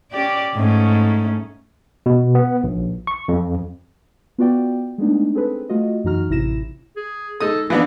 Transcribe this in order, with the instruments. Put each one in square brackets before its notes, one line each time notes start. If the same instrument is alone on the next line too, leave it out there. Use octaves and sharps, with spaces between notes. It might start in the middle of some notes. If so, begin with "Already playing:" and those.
[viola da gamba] C#4 G4 D5
G#2 A3 C#4
[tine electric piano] B2
B3
A#1
C#6
F2
[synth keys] B3 F4 F#4 D5 G5
G#3 A3 B3 D4 D#4
C4 G#4 A4 B4
A3 F4 F#4 D#5
F#2 E3 D#4 F#4 A#5 F6
A1 C3 E4 A#6 E7
[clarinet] G#4
[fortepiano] G#3 D#4 D#6 [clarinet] A4
[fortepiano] E3 B3 D4 [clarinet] A#3